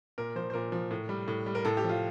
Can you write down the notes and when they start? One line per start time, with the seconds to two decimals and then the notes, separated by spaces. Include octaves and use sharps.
0.18 A#2 A#4
0.36 F3 C5
0.50 C5
0.53 A#2 A#4
0.72 F3
0.91 A2
1.09 G3
1.28 A2
1.46 G3
1.55 A#4
1.65 A2 A4
1.77 G4
1.84 F3
1.89 F4